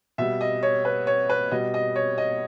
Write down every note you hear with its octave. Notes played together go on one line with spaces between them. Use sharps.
B2 G3 E5
D#5
C#5
B4
C#5
B4
B2 G3 D#5
D#5
C#5
D#5